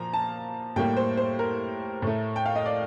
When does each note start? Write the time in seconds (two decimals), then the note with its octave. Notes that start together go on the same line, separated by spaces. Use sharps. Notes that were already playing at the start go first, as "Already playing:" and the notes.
Already playing: A#2 F3 A#3 A#5
0.13 A5
0.76 A2 G3 A#3 G5
0.97 C5
1.17 C5
1.39 A#4
2.02 A2 A3
2.36 G5
2.45 F5
2.55 D#5
2.66 D5